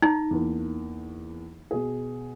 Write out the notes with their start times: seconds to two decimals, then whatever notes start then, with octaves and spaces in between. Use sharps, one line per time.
0.02 D#4 A#5
0.31 E2 A#3
1.71 B2 G#4